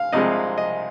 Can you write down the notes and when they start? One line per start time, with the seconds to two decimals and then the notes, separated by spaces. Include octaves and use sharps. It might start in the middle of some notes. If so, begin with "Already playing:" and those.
Already playing: F5
0.12 C2 C3 F3 G#3 D#5
0.58 D#5